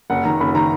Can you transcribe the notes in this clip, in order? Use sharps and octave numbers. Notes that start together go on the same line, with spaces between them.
F#1 F#5
D#3 A#5
F#1 B5
D#3 A#5